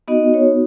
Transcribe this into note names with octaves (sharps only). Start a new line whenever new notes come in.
B3 D#4 F#4 D#5
C#5